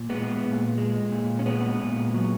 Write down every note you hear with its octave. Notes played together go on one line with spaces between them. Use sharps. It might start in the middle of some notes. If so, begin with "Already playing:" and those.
Already playing: A#2
G#3 B3
A#2
G#3
A#2
C#4
G#3 B3
A#2
F#3